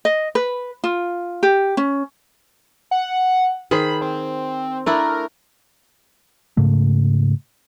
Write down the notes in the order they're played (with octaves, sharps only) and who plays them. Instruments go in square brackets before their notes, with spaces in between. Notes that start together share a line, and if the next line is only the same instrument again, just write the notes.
[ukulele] D#5
B4
F4
G4
C#4
[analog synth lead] F#5
[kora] D#3 G#4 C5 [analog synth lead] B5
[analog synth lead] C4
[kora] A3 D4 E4 [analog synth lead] A#4
[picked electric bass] G#2 C#3 A3